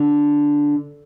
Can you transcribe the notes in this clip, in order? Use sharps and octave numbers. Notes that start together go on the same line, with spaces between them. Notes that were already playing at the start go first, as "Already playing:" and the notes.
Already playing: D3